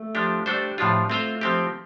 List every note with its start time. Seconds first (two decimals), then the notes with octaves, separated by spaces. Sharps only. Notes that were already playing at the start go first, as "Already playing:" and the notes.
Already playing: A3
0.15 F3 D4 G4
0.46 G3 A3 D4 A4 C5
0.78 A2 F3 D4 F4
1.09 A3 C4 F4 C5 F5
1.41 F3 C4 G4